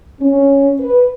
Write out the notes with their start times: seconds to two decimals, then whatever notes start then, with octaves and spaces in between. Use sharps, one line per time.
0.21 C#4
0.80 B4